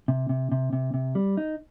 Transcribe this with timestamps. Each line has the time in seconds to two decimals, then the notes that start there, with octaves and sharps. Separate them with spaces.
0.08 C3
0.29 C3
0.52 C3
0.73 C3
0.94 C3
1.15 G3
1.37 D#4